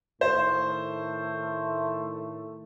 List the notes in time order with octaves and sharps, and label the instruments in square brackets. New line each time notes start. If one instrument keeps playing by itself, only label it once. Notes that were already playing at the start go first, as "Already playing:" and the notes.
[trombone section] A2 D#3 A3 [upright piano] C5